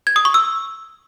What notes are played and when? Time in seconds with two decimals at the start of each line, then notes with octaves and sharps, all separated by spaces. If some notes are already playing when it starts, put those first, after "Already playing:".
0.07 G#6
0.16 D#6
0.25 C#6
0.34 E6